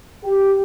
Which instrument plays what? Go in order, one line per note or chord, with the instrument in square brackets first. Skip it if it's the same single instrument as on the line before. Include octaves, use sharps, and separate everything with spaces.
[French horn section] G4